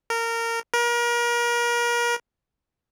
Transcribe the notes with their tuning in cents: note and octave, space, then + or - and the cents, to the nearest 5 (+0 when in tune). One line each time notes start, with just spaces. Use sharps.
A#4 -20
A#4 +35